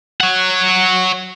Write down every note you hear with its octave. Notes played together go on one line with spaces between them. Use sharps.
C#5 F#5